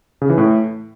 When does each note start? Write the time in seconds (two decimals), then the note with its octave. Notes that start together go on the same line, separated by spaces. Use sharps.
0.22 C#3
0.30 E3
0.38 A2